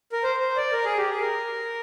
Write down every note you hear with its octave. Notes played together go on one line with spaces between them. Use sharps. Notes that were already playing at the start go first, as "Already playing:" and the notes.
A#4
C5
C5
D5
A#4
G#4
G4
G#4
A#4